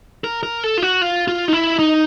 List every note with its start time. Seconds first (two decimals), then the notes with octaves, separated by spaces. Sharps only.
0.24 A#4
0.43 A#4
0.64 A4
0.78 F4
0.83 F#4
1.02 F4
1.28 F4
1.48 D#4
1.53 E4
1.79 D#4